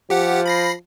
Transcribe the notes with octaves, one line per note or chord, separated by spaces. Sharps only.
F3 G4 F#5
B5 A#6 C7